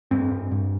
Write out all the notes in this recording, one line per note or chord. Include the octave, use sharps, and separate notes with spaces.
G2 C4
G2
G2